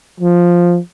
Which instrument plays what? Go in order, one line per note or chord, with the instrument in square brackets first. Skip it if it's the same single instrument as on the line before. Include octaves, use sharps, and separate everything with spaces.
[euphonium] F3